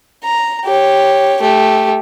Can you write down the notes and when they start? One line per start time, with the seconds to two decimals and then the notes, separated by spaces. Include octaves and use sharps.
0.24 A#5
0.66 G4 C#5
1.42 A3 G4